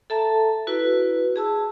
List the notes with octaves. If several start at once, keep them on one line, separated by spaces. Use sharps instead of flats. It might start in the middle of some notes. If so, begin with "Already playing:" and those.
A4 E5 A5 A#5
E4 F#4 B4
G#4 A5 E6